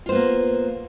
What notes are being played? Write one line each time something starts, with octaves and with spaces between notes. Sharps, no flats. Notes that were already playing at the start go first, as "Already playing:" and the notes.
A#3 B3 F4 C5